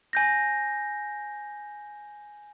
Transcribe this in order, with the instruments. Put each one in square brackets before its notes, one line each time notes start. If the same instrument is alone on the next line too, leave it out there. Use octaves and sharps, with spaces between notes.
[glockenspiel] G#5 G6 A#6